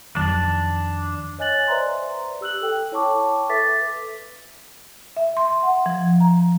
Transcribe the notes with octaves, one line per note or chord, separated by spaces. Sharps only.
F2 D#3 F#3 D4
C#5 D#5 G#5 F#6 A6 F#7
B4 C5 D5 E5 A#5 C6
G4 E6 F#6 F#7
A4 G5
E4 C#5 G5 A5 C#6 D6
A4 B4 E5 D6 A6 B6
E5
C6
F#5
F3
A#5